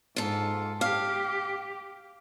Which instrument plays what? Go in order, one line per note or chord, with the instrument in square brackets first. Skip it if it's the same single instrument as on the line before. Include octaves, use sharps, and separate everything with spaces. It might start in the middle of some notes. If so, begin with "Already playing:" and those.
[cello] G#2 [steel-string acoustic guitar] F4 A4
[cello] G4 [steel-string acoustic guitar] F5